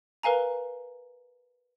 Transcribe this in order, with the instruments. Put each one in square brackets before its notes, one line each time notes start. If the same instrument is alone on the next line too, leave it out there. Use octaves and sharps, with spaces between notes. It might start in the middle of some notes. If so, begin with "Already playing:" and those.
[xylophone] A#4 B4 F5 G#5 A#5